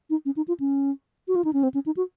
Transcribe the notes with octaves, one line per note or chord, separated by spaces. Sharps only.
D#4
C#4
D#4
F4
C#4
F#4
F4
D#4
C#4
C4
C#4
D#4
F#4